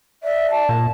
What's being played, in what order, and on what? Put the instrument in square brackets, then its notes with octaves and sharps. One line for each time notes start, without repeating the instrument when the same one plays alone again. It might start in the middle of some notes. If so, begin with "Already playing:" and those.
[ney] D5 [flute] E5
[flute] A5
[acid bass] A#2